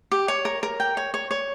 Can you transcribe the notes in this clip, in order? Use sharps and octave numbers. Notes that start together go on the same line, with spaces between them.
G4
C#5
A#4
A#4
G5
C#5
C#5
C#5